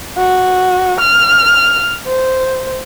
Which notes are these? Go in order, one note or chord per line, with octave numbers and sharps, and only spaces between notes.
F#4
F6
C5